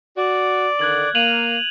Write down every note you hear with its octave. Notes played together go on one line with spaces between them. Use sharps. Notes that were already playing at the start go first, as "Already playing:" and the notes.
F#4 D5
D3 D#3 F#6 G#6 F#7
A#3 D#7 F7 F#7